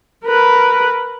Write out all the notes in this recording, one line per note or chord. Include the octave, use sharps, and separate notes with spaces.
A#4 B4